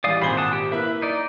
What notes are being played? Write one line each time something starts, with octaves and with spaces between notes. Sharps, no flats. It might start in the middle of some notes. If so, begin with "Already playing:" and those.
A1 E3 G3 D5 F5 D#6
G#1 A#2 G#4 C5 B5 G7
F#5 A5 D#6
G4
A#3 E4 B4 E5
D#4 D5